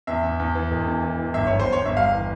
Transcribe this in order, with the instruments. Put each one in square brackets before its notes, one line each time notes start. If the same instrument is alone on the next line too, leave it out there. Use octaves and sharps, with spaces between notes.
[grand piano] E2 [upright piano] E5
[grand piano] E2
E2
E3
E1
E2
E3
E3
[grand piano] G1 [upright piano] E5
[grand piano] G1 [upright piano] C#5
[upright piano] C5
[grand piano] G1
[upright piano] C#5
[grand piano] G1 [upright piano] E5
[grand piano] G3 [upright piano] F5
[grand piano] E3